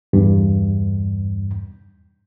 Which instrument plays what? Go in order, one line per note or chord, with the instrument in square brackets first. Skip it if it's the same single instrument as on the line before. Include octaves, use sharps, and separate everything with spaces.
[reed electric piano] E2 G2